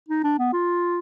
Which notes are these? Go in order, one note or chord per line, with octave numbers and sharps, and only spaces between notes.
D#4
D4
B3
F4